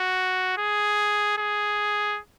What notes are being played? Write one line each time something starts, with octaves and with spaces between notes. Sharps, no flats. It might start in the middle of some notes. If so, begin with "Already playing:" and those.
Already playing: F#4
G#4
G#4